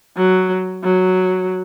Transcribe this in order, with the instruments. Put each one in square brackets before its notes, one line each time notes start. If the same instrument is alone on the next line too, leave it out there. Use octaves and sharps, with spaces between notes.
[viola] F#3
F#3